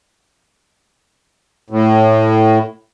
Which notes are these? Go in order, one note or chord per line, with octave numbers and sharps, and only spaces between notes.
A2